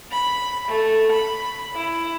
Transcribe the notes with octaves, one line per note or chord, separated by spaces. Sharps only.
B5
A3
B5
E4